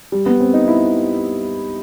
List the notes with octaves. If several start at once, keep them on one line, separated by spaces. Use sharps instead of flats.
G3
B3
C4
D#4
E4